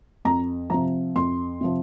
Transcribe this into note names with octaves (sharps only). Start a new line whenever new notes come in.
F2 A#5
C3 F3 A#5
F2 C6
C3 F3